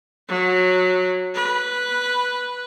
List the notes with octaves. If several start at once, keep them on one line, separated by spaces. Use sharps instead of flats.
F#3
B4